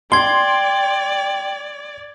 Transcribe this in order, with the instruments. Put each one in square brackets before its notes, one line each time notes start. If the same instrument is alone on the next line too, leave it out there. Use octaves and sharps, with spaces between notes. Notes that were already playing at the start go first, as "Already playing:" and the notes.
[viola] D5 [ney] G5 [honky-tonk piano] C6 [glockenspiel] G#6 G7